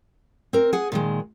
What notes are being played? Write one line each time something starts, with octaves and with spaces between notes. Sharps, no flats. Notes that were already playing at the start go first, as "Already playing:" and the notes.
C4 A#4
G#4 F#5
A#2 D#3 G#3